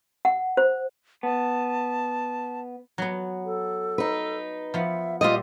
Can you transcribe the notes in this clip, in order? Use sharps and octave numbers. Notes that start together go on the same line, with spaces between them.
F#5
C5
B3 A5
F#3 B3
A4
D#4 B4
F3 B3 E5
A#2 G3 F4 G4 D#5 E5